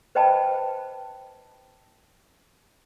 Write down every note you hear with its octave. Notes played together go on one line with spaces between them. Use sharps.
B4 C5 D#5 G5 A5 B5